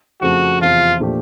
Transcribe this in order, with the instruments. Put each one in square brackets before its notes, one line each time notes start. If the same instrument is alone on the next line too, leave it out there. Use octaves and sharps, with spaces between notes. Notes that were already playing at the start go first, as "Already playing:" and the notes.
[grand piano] F2 C#3 F3 A3 [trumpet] F#4
[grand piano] E2 C3 F3 [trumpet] F4
[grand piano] A#2 F3 A3 D4 G4